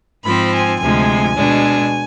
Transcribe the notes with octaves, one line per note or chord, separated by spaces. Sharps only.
G#2 F3 C4 B5
G#5
D2 C3 F3 G#3 G#5
B2 G#3 D4